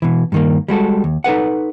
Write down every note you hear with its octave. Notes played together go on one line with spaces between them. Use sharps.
B2 E3
G2 D#3 A#3
G3 G#3 F#4 A4
D#2
D#4 A4 B4 F#5